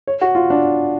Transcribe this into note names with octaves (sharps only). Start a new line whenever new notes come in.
C#5
F#4
F4
D4